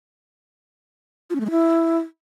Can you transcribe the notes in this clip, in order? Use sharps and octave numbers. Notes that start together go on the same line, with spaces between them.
F4
C#4
A3
G#3
E4